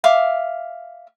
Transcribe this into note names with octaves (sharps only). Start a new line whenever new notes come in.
E5 F5 D6